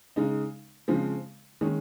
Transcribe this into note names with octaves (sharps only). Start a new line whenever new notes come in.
C#3 G#3 D#4
C#3 F3 G#3 C4
D#3 G#3 C#4